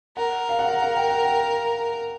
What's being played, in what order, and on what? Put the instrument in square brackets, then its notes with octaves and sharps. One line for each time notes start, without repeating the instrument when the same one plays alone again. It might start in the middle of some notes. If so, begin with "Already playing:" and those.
[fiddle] A#4 [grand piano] F#5
[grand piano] F5
F#5
F5
F#5
G5
F#5
G5